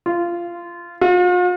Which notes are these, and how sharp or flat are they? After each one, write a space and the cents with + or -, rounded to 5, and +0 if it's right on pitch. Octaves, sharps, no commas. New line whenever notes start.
F4 -15
F4 +45